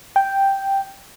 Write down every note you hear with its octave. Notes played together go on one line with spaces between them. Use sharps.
G5